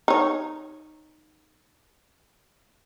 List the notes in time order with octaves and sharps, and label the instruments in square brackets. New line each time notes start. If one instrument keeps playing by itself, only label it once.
[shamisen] D#4 C#5